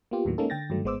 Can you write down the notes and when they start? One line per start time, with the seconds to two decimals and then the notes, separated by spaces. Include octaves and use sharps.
0.11 A#3 B3 F4 G4
0.25 D#2 A2 D#3 F#3 A#3
0.38 G#3 A#3 C#4 D#4 A4
0.50 D3 G5 A6 A#6
0.70 G2 D#3 F#3 A3
0.84 G#1 G#3 B3 C5 D6 E6